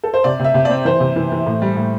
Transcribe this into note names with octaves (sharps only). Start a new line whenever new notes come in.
A4
C5
C3 D5
C3
E5
C3
C4 D5
E3 C5
C3
E3
E3
A2
G3
A2